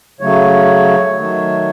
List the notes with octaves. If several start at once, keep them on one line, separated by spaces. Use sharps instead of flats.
C#3 F#3 A3 C#5
D#3 F#3 A3